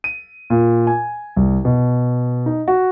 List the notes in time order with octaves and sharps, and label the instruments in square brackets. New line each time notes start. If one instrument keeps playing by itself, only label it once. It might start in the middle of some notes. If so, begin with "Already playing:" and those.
[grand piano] D#7
A#2
G#5
C2
B2
D#4
F#4